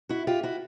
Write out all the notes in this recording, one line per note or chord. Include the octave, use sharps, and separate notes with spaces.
E4 F#4
F4 G4
E4 F#4